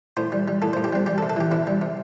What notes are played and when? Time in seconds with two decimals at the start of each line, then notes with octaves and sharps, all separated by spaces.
0.17 A2 C5
0.32 G3
0.48 G3
0.62 A2 A4
0.73 C5
0.77 A2
0.84 G4
0.93 G3 C4
1.06 G3 G4
1.18 A4
1.23 C3
1.30 A4
1.36 E3 G4
1.51 C3 E4
1.67 G3
1.81 C3